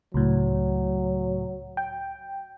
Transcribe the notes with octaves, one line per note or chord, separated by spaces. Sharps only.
C#2 A2 F#3
G5